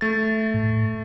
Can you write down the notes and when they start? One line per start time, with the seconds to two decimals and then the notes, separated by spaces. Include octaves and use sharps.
0.01 A3 A6
0.54 A2